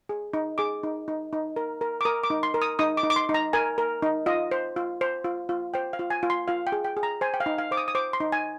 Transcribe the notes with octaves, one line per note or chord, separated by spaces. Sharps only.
G#4
D#4
G#4 D6
D#4
D#4
D#4
A#4
A#4
D6
A#4 D#6
D6
D#4
C6
A#4
D#6
D#4 D#6
D6
D#4
D6
C6
D#4
A#5
A#4 G#5
A#4
D#4
F4 D#5
C5
F4
C5
F4
F4
C5 G5
F5
F4
G#5
F4
C6
F4 F5
G5
G#4
G5
G#4
A#5
C5 G#5
G5
F5
D#4
F5
C5 D6
D#6
D#6
C5 D6
C6
D#4
G#5